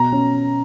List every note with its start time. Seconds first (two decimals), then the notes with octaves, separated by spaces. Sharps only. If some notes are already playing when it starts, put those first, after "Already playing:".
Already playing: B2 A#5
0.12 C#4